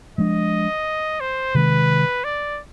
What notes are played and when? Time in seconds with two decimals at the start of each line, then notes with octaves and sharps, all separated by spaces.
0.18 F3 G#3 D4 D#5
1.20 C5
1.55 C3 D#3 G#3 B4
2.24 D5